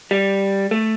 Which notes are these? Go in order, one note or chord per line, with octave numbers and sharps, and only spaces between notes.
G3
A3